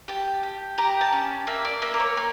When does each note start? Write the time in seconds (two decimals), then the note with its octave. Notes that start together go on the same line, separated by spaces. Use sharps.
0.08 G4 A5
0.43 G4
0.78 G4 A#5
1.01 A5
1.13 C#4
1.47 A#3 E5
1.65 D5
1.82 A#3 E5
1.94 A#4
2.00 C#5
2.17 A#3